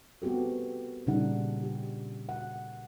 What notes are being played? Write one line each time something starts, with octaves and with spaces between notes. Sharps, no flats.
B3 C4 F#4 G4 A4
A#2 C#3 G3 D4 D#4 F#5
G4
F#5